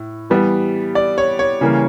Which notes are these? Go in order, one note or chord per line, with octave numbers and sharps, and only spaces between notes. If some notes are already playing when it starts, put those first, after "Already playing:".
Already playing: A2
E3 G3 B3
D5
C#5
C#5
C#3 E3 G3 A#3